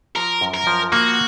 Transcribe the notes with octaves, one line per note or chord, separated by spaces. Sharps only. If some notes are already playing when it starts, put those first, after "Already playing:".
F3 A#4
F#2
A#4
F3
A#3 F#4